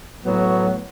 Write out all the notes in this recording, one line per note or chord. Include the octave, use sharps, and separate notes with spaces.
A2 F#3 B3 F#4